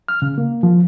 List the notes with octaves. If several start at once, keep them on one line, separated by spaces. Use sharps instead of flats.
F6
C#3
A#3
F3